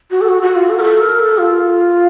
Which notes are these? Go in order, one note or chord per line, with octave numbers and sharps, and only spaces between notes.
F#4
A4
F#4
F#4
F4
A4
A#4
A4
A#4
A4
F4